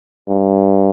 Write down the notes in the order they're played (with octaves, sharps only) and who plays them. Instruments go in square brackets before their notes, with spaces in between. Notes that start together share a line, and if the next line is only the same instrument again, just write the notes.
[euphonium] G2